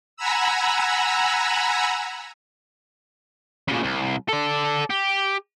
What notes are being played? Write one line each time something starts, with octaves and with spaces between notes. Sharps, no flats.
F#5 G#5 A#5 B5 E6
A#2 C#3
C2
A4 D5
G4